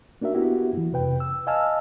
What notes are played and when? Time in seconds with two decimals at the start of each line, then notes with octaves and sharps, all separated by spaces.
0.21 A#3 D4 F#4 A#4 E5
0.34 A#3 B3 E4 F#4 G4
0.73 F#2 E3
0.92 F2 C3 B4 G5
1.20 E6
1.47 D#5 F5 G#5 A5 E6 F6